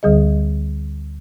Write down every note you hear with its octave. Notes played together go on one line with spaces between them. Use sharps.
D2 D3 G3 G#4 D#5